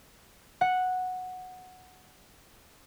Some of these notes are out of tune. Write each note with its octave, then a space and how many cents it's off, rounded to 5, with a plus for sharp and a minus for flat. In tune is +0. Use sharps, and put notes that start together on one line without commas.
F#5 -5